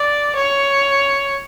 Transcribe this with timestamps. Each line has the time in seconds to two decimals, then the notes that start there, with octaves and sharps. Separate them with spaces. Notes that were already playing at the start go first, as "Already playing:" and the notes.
Already playing: D5
0.36 C#5